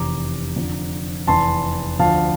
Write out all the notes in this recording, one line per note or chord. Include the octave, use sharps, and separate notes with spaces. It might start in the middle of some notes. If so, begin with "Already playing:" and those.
Already playing: F1 E2 C3 E3 A#5 D6
F1 F2 D3 F3
F1 E2 E3 A5 C6
D2 D3 F3 F5 A5